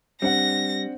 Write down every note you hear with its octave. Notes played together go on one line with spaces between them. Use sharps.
G3 C4 D4 F#5 A#6